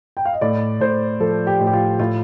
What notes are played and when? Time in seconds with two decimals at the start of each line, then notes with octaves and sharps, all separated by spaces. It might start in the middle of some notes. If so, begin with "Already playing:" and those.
0.17 G5
0.25 F5
0.33 D#5
0.41 A2 D5
0.80 A2 C5
1.20 F3 A4
1.47 G4
1.60 A2
1.67 G4
1.73 F4
1.99 A2 F4